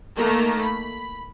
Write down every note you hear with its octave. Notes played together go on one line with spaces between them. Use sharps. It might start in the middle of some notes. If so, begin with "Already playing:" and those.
D#3 A3 A#3 A#4
B5